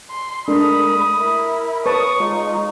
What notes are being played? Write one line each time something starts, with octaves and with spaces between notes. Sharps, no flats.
C6
G#3 A3 D4 A#4 B5 D#6
E4 A#4
B4 C#5 A5 C#6 D#6
G#3 D#4 F4